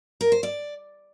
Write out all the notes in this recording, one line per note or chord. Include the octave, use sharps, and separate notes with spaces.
A#4
C5
D5